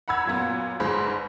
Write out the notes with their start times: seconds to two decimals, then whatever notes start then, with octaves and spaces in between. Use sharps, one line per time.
0.08 F#5 A#5 B5 E6 G#6
0.25 F#2 A#2 B3
0.80 G1 G#2 G#4 C5 B5